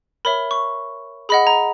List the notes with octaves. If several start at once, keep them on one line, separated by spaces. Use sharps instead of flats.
A#4 C#5 E5 B5
C#6
G#4 D#5 F#5 B5
A#5